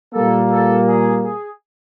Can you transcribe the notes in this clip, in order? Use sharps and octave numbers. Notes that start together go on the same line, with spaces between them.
A#2 G3 A#3 A4
A4
G#4
G#4